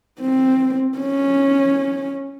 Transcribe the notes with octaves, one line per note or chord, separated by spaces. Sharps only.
C4
C#4